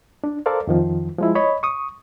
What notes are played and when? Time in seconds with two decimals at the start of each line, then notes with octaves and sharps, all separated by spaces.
0.24 D4
0.46 A4 A#4 C5 D5 F5
0.67 F2 D#3 F3
1.19 F3 G#3 E4
1.35 C#5 D#5 B5
1.63 C#6 D#6